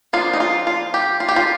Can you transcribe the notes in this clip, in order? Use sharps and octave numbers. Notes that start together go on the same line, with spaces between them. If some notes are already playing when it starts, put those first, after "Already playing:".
F3 A#3 D4 F4
D#4
F4
F4
G4
F4
G4
F4